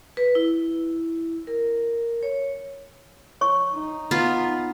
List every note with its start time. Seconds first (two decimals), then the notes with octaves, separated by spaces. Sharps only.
0.17 B4
0.35 E4
1.47 A#4
2.23 C#5
3.41 C#5 C#6
3.74 D#4
4.11 B3 F4